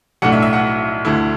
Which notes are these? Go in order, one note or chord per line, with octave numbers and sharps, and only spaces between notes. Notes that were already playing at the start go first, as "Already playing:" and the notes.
B1 A2 A3 D4 F#5
E5
E5
F#5
D2 D3 A3 E4